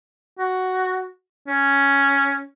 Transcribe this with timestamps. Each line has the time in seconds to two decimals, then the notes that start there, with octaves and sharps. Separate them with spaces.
0.38 F#4
1.47 C#4